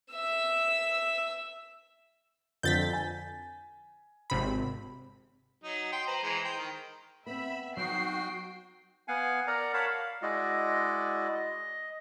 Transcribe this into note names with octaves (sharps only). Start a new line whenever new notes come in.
E5 E6
F2 D3 F3 G6 A6 B6
G#5
G#1 C3 B5
F#3 D#4
G5 C6
B4 C5 A#5
E3 G#3 A#5
C5 G5
D#3
B3 C4 E5 B5
F#3 D#4 F#4 G5 C7
B3 F5 F#5 G#5
A#4 D5 F#5 A#5
A#4 C#5 F5 F#5 A5 B5
F5
G#3 E4 F#4 D5 D#5
D#5